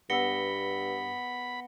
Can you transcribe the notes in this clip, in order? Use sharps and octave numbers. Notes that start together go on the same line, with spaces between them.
G2 B3 B5 E6 A#6 C#7 G7